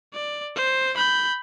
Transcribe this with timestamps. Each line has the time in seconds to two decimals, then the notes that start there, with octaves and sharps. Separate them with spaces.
0.13 D5
0.56 C5
0.97 B5 G6